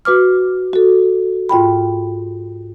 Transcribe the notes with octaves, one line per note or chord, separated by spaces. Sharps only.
F#4 B4 D6 F6
F#4 A4
G#2 F4 G5 B5